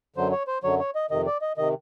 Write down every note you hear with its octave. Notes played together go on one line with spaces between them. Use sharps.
F#2 D3 F#3 C5
C#5
C5
F#2 D3 F#3 C#5
C#5
D#5
F2 C3 D#3 D#5
D5
D#5
C3 D#3 D#5